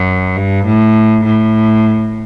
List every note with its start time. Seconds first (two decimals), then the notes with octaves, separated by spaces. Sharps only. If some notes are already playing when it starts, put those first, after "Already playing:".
Already playing: F#2
0.36 G2
0.66 A2
1.24 A2